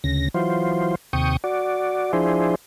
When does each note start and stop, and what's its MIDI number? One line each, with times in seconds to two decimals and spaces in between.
0.04 0.28 38
0.04 0.28 49
0.04 0.28 94
0.34 0.95 52
0.34 0.95 54
0.34 0.95 65
0.34 0.95 72
1.13 1.37 39
1.13 1.37 48
1.13 1.37 79
1.13 1.37 85
1.13 1.37 87
1.44 2.12 66
1.44 2.12 74
2.13 2.55 53
2.13 2.55 62
2.13 2.55 64
2.13 2.55 68
2.13 2.55 72